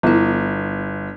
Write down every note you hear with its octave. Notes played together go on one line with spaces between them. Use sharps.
G1 B3 E4